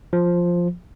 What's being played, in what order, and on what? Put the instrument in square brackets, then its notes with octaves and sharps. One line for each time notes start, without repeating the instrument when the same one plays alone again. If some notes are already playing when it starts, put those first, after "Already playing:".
[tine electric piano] F3